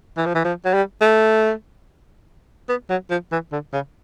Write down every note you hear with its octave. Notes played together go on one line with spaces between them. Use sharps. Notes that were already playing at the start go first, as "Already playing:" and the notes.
E3
F3
E3
F3
F#3
G3
A3
B3
F#3
F3
E3
D3
C#3